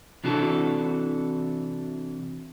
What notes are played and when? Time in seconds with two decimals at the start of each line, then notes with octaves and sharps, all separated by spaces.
0.24 C3 E3 D4 F#4 A4